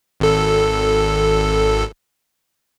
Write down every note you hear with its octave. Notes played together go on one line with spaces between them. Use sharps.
G#1 A4